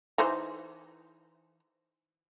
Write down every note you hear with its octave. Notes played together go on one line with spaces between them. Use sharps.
E3 D#4 C5